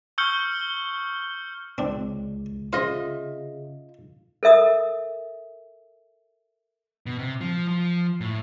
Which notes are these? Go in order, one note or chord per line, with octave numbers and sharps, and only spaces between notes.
C#6 E6 F6 G6 C#7 G7
C#2 C4 D4
C#3 F4 C5 D#5 E5
A4 A#4 E5 D#6
B2
C3
F3
F3
A2